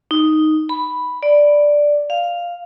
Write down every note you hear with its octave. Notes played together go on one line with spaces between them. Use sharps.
D#4
B5
D5
F5